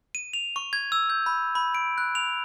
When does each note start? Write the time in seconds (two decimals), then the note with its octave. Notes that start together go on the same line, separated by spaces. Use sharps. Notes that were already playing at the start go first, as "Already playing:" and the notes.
0.15 D#7
0.33 F7
0.56 C#6
0.73 G#6
0.92 E6
1.10 G6
1.26 B5
1.55 B5
1.75 D7
1.98 F#6
2.15 F7